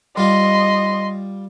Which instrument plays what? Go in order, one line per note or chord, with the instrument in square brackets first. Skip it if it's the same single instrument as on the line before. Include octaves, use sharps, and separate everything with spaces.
[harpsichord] G3 F4 [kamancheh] D#5 C6